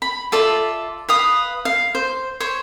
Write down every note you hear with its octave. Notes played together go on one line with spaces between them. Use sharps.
B5
F4 A4 D5 E5
B4 F5 D#6
F5
C5
C5 C#5